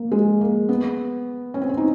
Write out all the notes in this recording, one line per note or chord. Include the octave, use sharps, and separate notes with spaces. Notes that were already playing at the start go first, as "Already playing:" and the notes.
Already playing: A#3
G#3
A#3
B3
C#4
C4
C#4
D#4